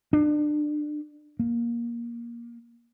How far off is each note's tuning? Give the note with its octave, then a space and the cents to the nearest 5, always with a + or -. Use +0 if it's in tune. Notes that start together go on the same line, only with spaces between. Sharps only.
D4 +25
A#3 +15